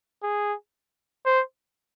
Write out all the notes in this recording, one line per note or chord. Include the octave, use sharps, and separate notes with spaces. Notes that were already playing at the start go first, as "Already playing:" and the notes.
G#4
C5